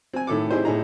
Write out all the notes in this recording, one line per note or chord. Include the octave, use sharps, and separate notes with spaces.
C4 G#5
A2 D#3 A4 D6
C4 D#4 E4 G4 G#4 C5
A2 D#4 G#4 A#5